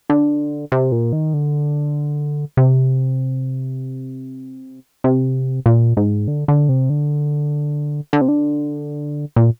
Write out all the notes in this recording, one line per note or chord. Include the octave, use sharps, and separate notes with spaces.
D3
C3
A#2
D#3
D3
C3
C3
A#2
G#2
D3
D3
C3
D3
D3
C3
D3
A#2